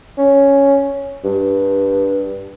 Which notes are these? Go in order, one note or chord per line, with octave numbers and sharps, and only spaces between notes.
C#4
G2